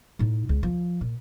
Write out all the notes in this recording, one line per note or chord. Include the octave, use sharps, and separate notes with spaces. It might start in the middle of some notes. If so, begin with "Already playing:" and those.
A2 D#4
C#2
F3
A#2